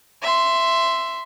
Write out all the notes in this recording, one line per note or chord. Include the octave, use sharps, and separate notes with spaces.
E5 C6